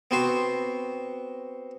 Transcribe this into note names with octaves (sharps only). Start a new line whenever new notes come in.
B3 C4 F#4 C5